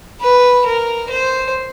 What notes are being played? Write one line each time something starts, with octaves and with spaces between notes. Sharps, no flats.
B4
A#4
C5